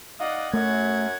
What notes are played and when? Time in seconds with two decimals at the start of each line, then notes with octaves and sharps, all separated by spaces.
0.20 D#4 D5 D#5 F5 F#5
0.53 F#2 A3 F#5 G#6